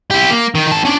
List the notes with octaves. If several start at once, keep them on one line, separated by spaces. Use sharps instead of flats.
E4 G4
A#3
D#3
D#3 A5
C#4 D4